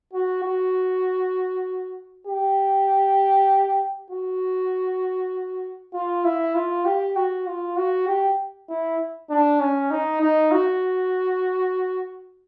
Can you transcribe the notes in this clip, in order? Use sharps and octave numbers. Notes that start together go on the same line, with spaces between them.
F#4
F#4
G4
F#4
F4
E4
F4
G4
F#4
F4
F#4
G4
E4
D4
C#4
D#4
D#4
F#4